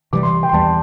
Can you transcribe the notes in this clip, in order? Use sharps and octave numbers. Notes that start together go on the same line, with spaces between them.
C3 E3 G3 D6
C6
G5
C6
E2 E3 G3 A5